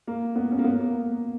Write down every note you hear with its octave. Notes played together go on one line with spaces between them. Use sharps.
A#3
B3
C#4
A#3
B3
A#3